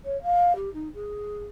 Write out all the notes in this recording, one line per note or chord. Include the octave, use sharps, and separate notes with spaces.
C#5
F5
G4
D#4
G#4